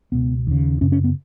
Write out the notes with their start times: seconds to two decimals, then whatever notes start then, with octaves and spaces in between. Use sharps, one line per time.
0.12 C#2 B2 B3
0.47 D#2 C#3
0.81 F#2 C#3 C#4
0.92 C#4
1.04 B3